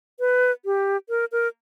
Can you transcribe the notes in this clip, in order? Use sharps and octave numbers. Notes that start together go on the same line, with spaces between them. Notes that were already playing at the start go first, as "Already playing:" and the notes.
B4
G4
A#4
A#4